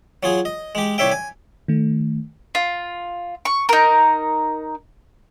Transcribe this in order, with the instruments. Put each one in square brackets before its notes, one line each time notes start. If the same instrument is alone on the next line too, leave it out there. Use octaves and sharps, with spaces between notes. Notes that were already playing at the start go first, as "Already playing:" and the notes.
[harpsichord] F#3 F4 G#4
D#5
G#3 G4
C2 G4 C#5 E5 G5
G#5
[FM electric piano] D#3 A3
[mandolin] F4
C#6
D#4 A#4